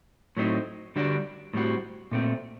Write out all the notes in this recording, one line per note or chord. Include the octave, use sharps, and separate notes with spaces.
A2 F#3 A3 C4 D#4
D3 G3 D4 F#4
A2 G3 C4 F#4
A#2 A3 C4